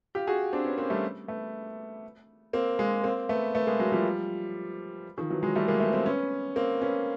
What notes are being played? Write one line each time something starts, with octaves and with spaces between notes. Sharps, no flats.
F4 G4
F#4 G#4
C4 D4
B3 C#4
A#3 C4
G3 A3
A3 B3
A#3 C4
G#3 A#3
A#3 C4
A3 B3
A3 B3
G#3 A#3
F#3 G#3
F3 G3
D#3 F3
E3 F#3
F#3 G#3
G3 A3
G#3 A#3
A3 B3
A#3 C4
B3 C#4
A#3 C4
B3 C#4